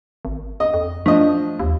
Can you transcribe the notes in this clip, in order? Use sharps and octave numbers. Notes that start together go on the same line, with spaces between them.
G#1
D#5
F2
F3 A3 D4 D#5
D#2